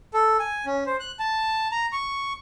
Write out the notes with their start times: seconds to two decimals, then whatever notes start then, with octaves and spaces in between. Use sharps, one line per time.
0.14 A4
0.40 G#5
0.66 C#4
0.86 C5
1.00 F#6
1.19 A5
1.72 A#5
1.93 C#6